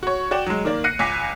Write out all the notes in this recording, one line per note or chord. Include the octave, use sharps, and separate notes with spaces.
F#4 C#5
F#4 D5 G5 E7
F#3 G#3
D#3 A#3 D5
F#6 A#6 C7 C#7 D#7
C#2 G#5 D6 B6